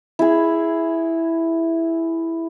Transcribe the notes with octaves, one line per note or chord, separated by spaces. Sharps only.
E4 G#4